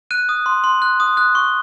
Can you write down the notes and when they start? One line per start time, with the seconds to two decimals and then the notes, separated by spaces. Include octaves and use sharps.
0.11 F#6 D#7
0.29 D#6
0.46 C6
0.64 C6
0.82 F#6
1.00 D#6
1.17 F#6
1.35 C#6